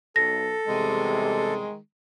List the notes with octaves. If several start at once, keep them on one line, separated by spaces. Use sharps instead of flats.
B1 A4 A#6
E2 C3 D#3 G3 G#3